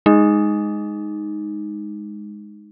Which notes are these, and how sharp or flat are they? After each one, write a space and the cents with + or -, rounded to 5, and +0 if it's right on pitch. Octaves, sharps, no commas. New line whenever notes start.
G#3 +0 D#4 +0